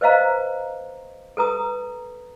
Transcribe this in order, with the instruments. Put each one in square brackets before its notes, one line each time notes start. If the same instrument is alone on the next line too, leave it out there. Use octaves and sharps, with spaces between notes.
[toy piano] B4 C5 D#5 F5 A#5
A4 B4 A#5 D#6